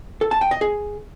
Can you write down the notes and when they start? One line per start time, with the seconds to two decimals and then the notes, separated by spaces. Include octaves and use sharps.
0.21 A4
0.31 A5
0.41 G5
0.51 D#5
0.61 G#4